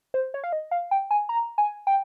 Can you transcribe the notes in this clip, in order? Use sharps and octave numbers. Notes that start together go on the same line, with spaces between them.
C5
C#5
F5
D#5
F5
G5
G#5
A#5
G#5
G5